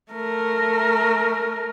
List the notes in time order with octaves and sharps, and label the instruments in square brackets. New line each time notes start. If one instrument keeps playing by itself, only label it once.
[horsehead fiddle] A3 A#4